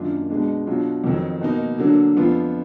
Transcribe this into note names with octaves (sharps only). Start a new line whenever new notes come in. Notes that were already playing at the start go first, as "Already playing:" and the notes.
Already playing: F#2 D#3 A#3 D4 F4
B2 G#3 D4
B2 F#3 D4 F4
F2 D#3 F#3
B2 A#3 D#4
D3 F#3 A#3 D4
F2 F3 B3 D4 F4